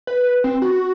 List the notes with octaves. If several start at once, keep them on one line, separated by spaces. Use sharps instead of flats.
B4
C4
F#4